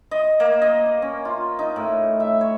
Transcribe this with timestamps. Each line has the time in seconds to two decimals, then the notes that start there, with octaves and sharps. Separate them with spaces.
0.11 D#5
0.40 A#3
0.62 D#5
0.86 D5
1.02 C#4
1.25 F4
1.59 D#4
1.76 A2
2.20 E5
2.41 C#5